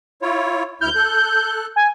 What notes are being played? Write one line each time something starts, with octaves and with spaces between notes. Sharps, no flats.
E4 F4 C#5
D2 E4 F6 G6
A4 F#6
G#5